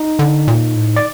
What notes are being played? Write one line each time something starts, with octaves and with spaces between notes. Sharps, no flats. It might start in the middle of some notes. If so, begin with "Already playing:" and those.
Already playing: D#4
D3
A#2
A2
D5